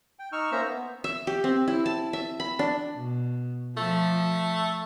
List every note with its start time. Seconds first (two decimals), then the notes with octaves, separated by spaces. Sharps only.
0.19 G5
0.32 D#4 C#6 E6 F6
0.52 A#3 C#4 C5 E5 A#5 E6
0.66 B3
1.04 E5
1.27 G4
1.44 C4
1.68 E4
1.86 A5
2.13 E5
2.40 B5
2.59 D4
2.95 B2
3.77 F3 A3